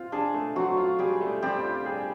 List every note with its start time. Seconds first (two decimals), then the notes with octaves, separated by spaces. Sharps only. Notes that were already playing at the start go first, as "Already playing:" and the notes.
Already playing: C4 F4
0.12 D4 G#4
0.34 A3
0.56 F#3 C4 F#4
0.77 F4
0.99 G3 G4 G#4
1.21 A3
1.42 G3 C4 G4
1.64 F4
1.86 G#4